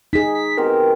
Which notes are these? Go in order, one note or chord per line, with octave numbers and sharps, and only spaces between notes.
D#4 G#4 B6
B6
B2 C4 G4 A#4